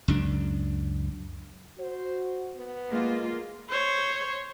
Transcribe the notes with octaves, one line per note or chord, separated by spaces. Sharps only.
C#2 F#2 D4
F#4 C5
B3
G#3 A#3 F4
C5 C#5